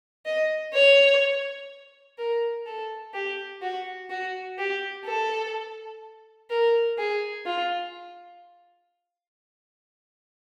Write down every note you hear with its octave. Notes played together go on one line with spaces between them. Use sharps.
D#5
C#5
A#4
A4
G4
F#4
F#4
G4
A4
A#4
G#4
F4